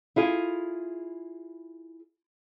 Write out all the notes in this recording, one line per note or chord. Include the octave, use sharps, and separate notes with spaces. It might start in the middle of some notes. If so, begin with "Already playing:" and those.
E4 F4 G#4